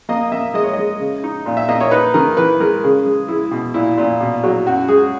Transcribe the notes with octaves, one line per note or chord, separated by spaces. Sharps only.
A#3 D#5
A#3 E5
G#3 D#5
C#5
G#3 D#5
C#3
D#4
A#2
E5
A#3 D#5
C#5
D#4 B4
D#3 A#4
E3 B4
G#3 A#4
C#3 G#4
G#3
G#3 E4
B2
A#2 E4
A#2
B2
F#3
F#2 F#4
G#3 G#4